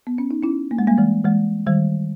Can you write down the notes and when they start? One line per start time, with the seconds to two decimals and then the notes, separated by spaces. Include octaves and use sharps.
0.07 B3
0.18 C#4
0.31 D#4
0.43 C#4 E4
0.71 A#3
0.79 G#3
0.87 G3 A#3
0.98 E3 G#3
1.25 E3 G#3
1.67 D#3 G3